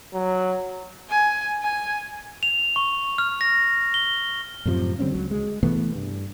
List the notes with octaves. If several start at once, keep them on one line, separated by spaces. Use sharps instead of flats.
F#3
G#5
G#5
F7
C#6
F6
A#6
G7
F#2 A2 C3 F3
D3 G3 C4 C#4
C#2 F#3
G#3
C3 E3 A3 B3
G2